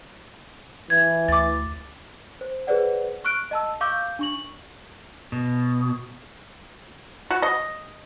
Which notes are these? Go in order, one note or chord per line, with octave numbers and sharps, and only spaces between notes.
E3 G#6
D2 D6 A6
C5
G#4 B4 C5 D5 F#5
C#6 F6 F#6 D7
D#5 A5 E6
F5 C#6 D6 E6 G6
D4 C#6 F#7
B2
F#4
D#5